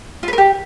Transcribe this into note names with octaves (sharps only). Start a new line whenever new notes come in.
F4
B4
A#4
G4